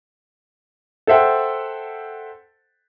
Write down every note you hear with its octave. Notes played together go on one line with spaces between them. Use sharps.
A4 C5 E5 F#5 G5